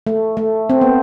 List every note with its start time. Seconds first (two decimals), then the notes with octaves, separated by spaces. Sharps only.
0.07 A3
0.37 A3
0.70 C4
0.81 B3